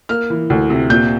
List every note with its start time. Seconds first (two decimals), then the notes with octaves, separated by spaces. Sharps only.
0.09 A#3 F6
0.30 E3
0.50 D2
0.70 C3
0.90 A#2 G6